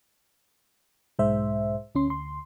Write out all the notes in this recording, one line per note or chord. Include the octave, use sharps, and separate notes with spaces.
B1 G#2 G#3 C5 E5
D2 C#4 C6
D2 C6